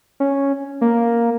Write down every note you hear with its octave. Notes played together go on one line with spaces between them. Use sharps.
C#4
A#3